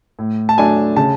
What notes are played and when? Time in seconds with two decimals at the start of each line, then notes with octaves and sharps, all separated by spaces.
0.19 A2
0.49 A5
0.58 F#3 A3 D4 G#5
0.96 C#3 A5